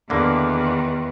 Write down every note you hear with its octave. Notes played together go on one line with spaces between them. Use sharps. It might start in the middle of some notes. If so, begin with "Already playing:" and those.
E2 D3 D#3 A#3